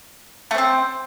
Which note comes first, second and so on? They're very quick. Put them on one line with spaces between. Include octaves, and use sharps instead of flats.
A3 C5 C4